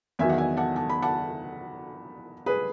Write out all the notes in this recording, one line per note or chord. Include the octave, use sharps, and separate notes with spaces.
E2 D#3 F#3 E5 G#5
F#5
E5 G#5
F#5 A5
A5
B5
F#5 A5
G#4 B4